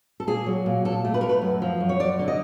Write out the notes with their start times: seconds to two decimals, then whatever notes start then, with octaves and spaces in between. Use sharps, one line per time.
0.20 A4
0.27 A#2 G#4
0.46 F#3
0.66 A#2
0.85 A#2 A4
1.05 A3
1.14 B4
1.21 A3 A#4
1.29 B4
1.42 F#2
1.62 F3
1.81 F#2
1.89 C#5
2.00 F#2 D5
2.19 D3
2.28 D#5